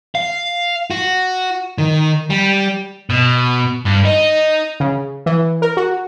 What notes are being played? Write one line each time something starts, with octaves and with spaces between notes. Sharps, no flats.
F5
F#4
D#3
G3
B2
G2
D#4
C#3
E3
A#4
F#4